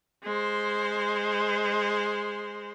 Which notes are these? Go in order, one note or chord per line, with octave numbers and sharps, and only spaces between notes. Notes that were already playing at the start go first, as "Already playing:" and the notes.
G#3 C5